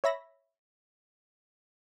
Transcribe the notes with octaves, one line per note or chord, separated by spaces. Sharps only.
C#5 E5 B5 A#6